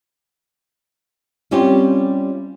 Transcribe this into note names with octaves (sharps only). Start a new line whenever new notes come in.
G3 C4 C#4 E4 F4 G4